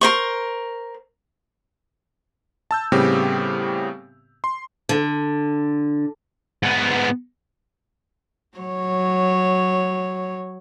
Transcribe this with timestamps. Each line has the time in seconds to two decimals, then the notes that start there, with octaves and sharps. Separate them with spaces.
0.01 A#4 C5 C#6
2.71 A5 E6 G6
2.92 A2 C#3 G3 B3 C4 G4
4.44 C6
4.89 D3
6.63 G#2 B3
8.58 F#3 C#5